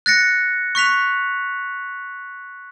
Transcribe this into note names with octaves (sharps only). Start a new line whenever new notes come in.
F#6 A6 A#6 C#7
C#6 F#6 B6 F7